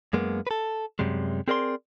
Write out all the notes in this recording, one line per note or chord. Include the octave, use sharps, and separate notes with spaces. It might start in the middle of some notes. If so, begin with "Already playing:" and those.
F#2 G#3 A#3 B3
A4 B4
F#2 C3 G3 G#3
C4 G#4 A#4 D5 E5 C6